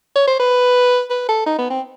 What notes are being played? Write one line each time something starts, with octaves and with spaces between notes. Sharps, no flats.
C#5
C5
B4
B4
A4
D#4
B3
C4